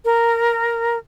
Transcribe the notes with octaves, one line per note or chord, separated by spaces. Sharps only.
A#4